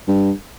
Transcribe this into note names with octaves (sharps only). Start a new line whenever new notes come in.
G2